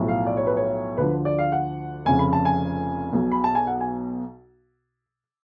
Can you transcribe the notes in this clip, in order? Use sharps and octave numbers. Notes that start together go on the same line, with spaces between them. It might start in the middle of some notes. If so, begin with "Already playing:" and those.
Already playing: B1 A2 F3
F5
D5
C#5
B4
C#5
D2 D3 F3 B4
D5
F5
F#5
F1 F2 C#3 G#5
B5
A5
G#5
B1 B2
B5
A5
G#5
F#5
G#5